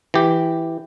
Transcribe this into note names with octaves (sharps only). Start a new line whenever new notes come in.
E3 G4